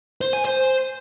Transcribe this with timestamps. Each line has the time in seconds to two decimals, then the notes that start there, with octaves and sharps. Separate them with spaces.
0.21 C5
0.33 G#5
0.45 C5